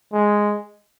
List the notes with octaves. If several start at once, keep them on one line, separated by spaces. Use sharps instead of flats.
G#3